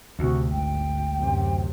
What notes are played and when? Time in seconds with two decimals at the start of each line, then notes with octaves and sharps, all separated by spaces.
0.19 D2 C3 F#4
0.51 G#1 G5
1.19 F#2 C3